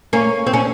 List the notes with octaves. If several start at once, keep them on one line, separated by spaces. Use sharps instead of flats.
A#3 C#4
C4
C#4